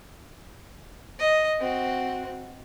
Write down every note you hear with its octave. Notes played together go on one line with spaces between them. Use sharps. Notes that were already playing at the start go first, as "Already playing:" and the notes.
D#5
C4 F#4